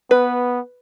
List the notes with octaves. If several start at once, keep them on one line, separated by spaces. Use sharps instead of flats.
B3 B4